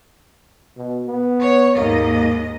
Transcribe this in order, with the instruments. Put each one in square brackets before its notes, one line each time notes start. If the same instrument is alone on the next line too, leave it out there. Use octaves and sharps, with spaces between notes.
[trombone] B2
B3
[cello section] C#5
[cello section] D#2 G#2 D#5 [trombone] A#3